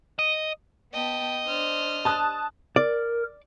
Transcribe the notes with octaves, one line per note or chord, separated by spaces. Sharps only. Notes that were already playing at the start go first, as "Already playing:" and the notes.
D#5
B3 D#5 G5 A5
D4 C5 F6
A5 D#6 F#6
A#4 D5